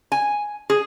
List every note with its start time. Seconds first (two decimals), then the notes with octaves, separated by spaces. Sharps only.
0.12 G#5
0.70 G#4